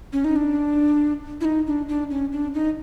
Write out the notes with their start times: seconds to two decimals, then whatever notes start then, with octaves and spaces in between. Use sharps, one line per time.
0.13 C#4
0.24 D#4
0.36 D4
1.41 E4
1.45 D#4
1.67 D4
1.88 D4
2.11 C#4
2.32 D4
2.54 D#4